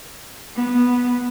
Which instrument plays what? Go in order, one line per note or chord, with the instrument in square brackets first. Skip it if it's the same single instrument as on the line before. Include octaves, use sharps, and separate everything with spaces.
[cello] B3